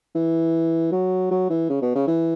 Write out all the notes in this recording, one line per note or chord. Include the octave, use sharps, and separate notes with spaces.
E3
F#3
F#3
E3
C#3
B2
C#3
E3